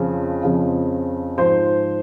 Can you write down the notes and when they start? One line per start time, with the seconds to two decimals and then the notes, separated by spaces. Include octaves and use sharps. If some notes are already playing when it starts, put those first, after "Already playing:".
Already playing: F2 C#3 F3
0.43 F2 C#3 F3
1.38 G#2 F3 C5 C6